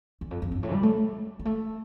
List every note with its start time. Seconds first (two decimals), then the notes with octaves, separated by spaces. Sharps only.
0.21 E2
0.31 F2
0.42 F2
0.52 G2
0.63 A2
0.73 G3
0.83 A3
1.39 G3
1.45 A3